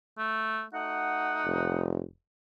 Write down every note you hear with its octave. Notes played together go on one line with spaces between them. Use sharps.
A3
A3 D#4 F#4 F#5
F1